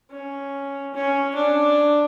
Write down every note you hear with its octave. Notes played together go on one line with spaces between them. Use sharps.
C#4
C#4
D4